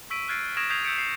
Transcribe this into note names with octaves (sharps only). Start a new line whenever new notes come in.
C#6 E6 B6 D7 D#7
F6 F#6 G#6 A6 C7 D7
C#6 D#6 G#6 A#6 D7 E7
D#6 G6 G#6 B6 C7 F7
E6 G6 B6 C#7 D7
C7